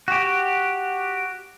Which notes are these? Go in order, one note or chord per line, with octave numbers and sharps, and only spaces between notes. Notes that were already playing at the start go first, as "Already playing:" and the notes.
F#4 G4